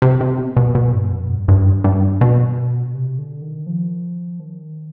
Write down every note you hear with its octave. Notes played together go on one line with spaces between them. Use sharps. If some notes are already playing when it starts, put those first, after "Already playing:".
C3
C3
B2
B2
B2
G2
F2
G2
G2
G2
B2
C3
D3
D#3
F3
D#3